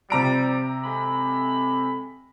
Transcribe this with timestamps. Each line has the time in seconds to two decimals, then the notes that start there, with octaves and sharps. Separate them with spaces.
0.10 C3 F3 G3 A#5 D7
0.84 G#3 A4 B5